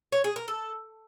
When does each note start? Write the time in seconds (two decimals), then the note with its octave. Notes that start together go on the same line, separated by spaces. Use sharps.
0.12 C#5
0.24 G#4
0.36 A#4
0.48 A4